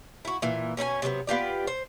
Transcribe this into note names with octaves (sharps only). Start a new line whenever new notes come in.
E4 F#4
A#2 E3
B2 C#4 D#4 G#5
C3 F#3 G3 B3
B3 F4 G4 D5
C5